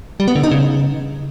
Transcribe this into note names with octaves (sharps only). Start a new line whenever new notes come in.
G3
B3
D3
D#4
C#3